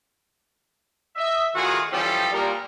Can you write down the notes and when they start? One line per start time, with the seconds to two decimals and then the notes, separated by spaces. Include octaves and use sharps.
1.16 D#5 E5
1.55 A2 D#3 F4 F#4 G#4
1.92 E3 F3 G3 C#4 G4 A4
2.32 A#2 G3 A#4